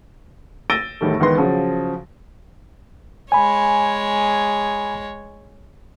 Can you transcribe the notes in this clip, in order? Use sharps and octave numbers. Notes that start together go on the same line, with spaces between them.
E6 A6 A#6 D7 D#7 G7
E2 A2 D#3 G3 A3
C#2 D#3 E3 B3 C6 A#6
C#3 F3 F#3
G#3 C#5 G#5 B5